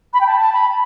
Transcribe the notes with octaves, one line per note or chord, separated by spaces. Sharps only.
B5
G5
A5
A5
B5